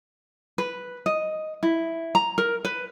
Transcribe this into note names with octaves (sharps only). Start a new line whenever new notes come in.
B4
D#5
E4
A#5
A#4
B4